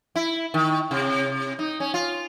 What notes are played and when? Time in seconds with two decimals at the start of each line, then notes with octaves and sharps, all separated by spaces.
0.16 E4
0.54 D#3
0.91 C3
1.59 D#4
1.80 C#4
1.94 F4